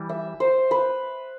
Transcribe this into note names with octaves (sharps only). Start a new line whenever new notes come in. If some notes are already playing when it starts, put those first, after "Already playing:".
Already playing: E3 G3
E5
C5
B4